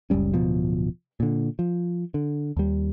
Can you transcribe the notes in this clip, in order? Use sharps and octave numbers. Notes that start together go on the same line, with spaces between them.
F#1 C#2 G3 C#4
D1 B2 F3
A#2 D3
F3
D3
D#2 G3